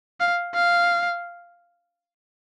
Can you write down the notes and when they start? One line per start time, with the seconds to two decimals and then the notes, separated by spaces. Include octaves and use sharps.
0.20 F5
0.55 F5